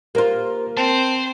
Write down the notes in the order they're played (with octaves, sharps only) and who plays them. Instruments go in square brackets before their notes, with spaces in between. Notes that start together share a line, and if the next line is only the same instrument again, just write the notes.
[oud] A#3 F4 [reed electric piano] G4 A#4 C5
[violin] C4 [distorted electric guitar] C5 [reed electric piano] A5